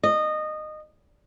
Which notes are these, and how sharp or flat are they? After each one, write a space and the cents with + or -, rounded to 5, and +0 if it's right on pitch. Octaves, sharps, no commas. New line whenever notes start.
D#5 -20